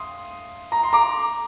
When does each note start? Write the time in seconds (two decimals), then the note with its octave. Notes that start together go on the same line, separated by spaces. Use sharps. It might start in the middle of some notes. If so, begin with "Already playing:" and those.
Already playing: C6 D#6
0.72 A#5
0.83 C6
0.93 A#5 D6